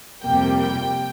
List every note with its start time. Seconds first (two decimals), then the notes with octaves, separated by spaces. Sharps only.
0.22 F2 C3 G3 A#3 G5
0.59 G5